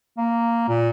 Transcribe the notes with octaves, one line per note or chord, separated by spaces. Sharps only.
A#3
A#2